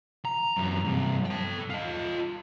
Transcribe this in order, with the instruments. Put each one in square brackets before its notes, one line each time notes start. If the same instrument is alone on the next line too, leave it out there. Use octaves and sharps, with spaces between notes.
[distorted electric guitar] A#5
F#2 E3
G2 C3
A4 G5
F4 D#5